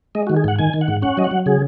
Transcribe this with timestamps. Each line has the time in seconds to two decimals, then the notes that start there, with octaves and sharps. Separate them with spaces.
0.15 G#3 D#5
0.27 F#4
0.30 D#3
0.36 G#4
0.44 G#2 F#5
0.59 D#3 G#5
0.74 D#3
0.81 F#5
0.88 G#2
1.02 C#4 F#5
1.17 F#3 D#5
1.24 F#5
1.31 F#3
1.46 C#3 G#4